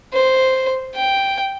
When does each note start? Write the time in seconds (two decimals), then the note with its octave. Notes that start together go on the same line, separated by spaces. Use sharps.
0.13 C5
0.95 G5